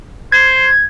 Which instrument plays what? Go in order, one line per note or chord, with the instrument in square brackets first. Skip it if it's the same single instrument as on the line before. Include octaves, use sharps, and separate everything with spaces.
[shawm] C5 [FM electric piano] G#6